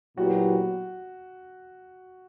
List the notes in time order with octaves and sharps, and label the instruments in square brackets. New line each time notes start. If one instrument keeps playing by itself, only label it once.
[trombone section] A#2 F#3 B3 E4 G4 [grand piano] F#4